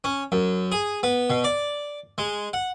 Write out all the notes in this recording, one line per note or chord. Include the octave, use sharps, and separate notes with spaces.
C#4
F#2
G#4
B3
B2
D5
G#3
F#5